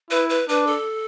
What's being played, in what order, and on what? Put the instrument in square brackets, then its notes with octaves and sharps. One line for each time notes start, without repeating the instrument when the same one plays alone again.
[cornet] E4 [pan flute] B4
[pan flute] B4
[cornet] D4 [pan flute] B4
[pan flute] A4